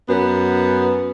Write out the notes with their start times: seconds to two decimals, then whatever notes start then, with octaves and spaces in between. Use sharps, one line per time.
0.08 F#2 B3